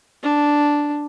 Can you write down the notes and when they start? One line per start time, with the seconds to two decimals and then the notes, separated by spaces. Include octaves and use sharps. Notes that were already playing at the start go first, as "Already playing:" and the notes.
0.23 D4